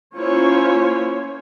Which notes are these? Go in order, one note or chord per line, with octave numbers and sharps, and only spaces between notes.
A#3 C#4 E4 F4 C5 C#5